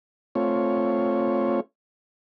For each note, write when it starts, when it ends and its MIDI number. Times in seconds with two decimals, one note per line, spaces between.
0.35 1.60 57
0.35 1.60 60
0.35 1.60 65
0.35 1.60 73